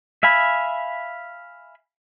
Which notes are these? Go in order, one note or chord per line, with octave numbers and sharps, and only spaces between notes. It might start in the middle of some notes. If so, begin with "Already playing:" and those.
E5 F5 G#5 B5